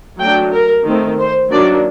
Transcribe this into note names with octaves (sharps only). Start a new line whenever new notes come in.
F#3 A3 D4 G5
A#4
D#3 A3 C4
C5
D#3 F#3 A#3 D4 D5